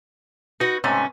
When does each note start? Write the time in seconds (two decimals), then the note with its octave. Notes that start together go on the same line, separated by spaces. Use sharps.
0.60 D#4 F#4 B4
0.84 G#2 C3 A3 C#4